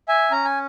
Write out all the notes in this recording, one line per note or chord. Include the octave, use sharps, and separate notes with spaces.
E5 G#5
C#4 A#5
G#5